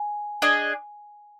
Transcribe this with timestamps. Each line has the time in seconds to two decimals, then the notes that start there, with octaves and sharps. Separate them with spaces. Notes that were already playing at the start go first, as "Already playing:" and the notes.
Already playing: G#5
0.42 D4 G#4 D#5